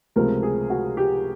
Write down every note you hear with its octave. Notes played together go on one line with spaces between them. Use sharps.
C#2 C3 F3 A3 C4 A#4
G#4
F#4
G4